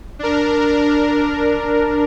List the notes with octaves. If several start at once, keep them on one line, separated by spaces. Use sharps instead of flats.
D4 A#4